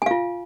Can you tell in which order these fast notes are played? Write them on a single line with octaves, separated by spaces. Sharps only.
G#5 F5 F4